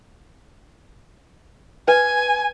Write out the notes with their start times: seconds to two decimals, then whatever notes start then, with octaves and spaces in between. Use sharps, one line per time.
1.88 B4 G#5